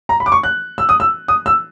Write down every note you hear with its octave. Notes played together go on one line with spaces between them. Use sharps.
A#5
B5
D6
C#6
F#6
E6
D#6
E6
D#6
E6